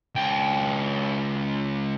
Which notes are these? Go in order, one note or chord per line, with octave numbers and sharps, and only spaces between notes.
C#2 G5